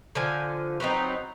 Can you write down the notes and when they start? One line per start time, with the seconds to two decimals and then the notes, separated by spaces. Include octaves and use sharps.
0.15 D3 F3 G#5
0.80 F#3 B3 C4 D#4